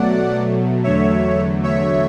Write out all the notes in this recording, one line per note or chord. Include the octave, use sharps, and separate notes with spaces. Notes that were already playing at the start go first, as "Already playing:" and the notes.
Already playing: B2 F#3 A3 D5 F#5
E2 D3 F#3 A3 C#5 E5
C#5 E5